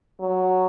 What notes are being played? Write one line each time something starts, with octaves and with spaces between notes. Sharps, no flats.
F#3